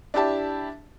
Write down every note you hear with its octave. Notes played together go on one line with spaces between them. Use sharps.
D4 E4 G4 A5